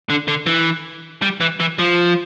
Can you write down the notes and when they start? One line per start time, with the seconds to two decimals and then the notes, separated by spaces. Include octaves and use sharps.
0.10 D3
0.28 D3
0.46 E3
1.22 G3
1.41 E3
1.60 E3
1.79 F3